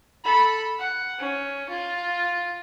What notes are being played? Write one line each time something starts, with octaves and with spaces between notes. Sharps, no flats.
A4 B5
F#5
C#4
F4